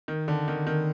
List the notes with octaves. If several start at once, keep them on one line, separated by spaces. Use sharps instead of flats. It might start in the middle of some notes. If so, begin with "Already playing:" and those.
D#3
D3
D#3
D#3